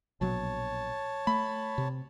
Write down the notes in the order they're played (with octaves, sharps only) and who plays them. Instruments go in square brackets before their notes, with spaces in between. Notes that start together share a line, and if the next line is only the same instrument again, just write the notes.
[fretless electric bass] A#1 B2 F#3 [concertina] C#5 A5
[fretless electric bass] A3 [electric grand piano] B5
[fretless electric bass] C3